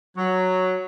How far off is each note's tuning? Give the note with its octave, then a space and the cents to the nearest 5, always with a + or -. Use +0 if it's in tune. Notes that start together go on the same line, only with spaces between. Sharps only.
F#3 +0